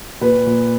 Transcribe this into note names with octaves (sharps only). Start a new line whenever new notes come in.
A#2 B4
A#2